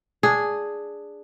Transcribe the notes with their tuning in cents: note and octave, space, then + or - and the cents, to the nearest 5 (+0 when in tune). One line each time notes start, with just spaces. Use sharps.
D4 +0 G#4 +0